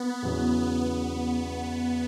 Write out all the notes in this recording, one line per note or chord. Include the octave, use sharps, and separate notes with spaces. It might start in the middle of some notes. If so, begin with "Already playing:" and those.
Already playing: B3
E2 C#3 F#3 C#4
B3